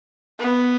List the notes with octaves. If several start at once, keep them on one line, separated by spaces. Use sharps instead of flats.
B3